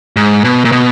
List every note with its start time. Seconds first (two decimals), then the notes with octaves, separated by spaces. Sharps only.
0.16 G#2
0.44 B2
0.65 A#2
0.72 B2